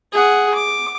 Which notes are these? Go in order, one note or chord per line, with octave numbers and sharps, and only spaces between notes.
G#4 F#5
D6